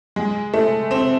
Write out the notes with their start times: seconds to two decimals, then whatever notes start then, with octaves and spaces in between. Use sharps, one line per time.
0.16 G#3
0.54 A3
0.91 C4